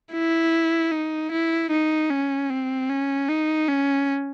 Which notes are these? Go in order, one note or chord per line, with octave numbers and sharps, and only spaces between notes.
E4
D#4
E4
D#4
C#4
C4
C#4
D#4
C#4